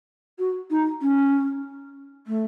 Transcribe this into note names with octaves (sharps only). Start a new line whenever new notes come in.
F#4
D#4
C#4
A3